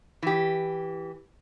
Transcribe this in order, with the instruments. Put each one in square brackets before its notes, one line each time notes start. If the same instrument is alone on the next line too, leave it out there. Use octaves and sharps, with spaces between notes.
[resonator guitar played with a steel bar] E3 G4